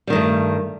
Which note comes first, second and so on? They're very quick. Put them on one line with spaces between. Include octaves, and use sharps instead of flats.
G3 D#3 G2 A3